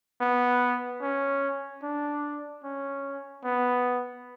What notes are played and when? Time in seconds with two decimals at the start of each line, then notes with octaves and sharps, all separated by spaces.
0.21 B3
1.02 C#4
1.83 D4
2.64 C#4
3.45 B3